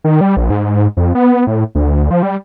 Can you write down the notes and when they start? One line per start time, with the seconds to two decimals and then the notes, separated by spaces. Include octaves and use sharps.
0.04 D#3
0.21 G3
0.37 A#1
0.50 G#2
0.97 F2
1.15 B3
1.47 A2
1.75 D2
2.11 F3
2.23 G3